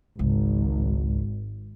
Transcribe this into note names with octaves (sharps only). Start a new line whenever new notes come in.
G#1 C#2